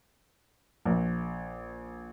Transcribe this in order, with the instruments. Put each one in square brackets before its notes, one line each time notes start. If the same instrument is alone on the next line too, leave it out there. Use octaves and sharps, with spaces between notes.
[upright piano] A#1